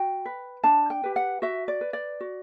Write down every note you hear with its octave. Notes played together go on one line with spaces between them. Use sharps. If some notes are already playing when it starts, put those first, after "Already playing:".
Already playing: F#4 G5
B4
D4 A5
G5
G4 B4
F#5
F#4 E5
D5
B4
D5
F#4